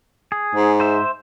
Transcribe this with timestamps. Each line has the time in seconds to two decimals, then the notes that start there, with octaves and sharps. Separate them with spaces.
0.32 G#4
0.55 G#2
0.80 C5 E5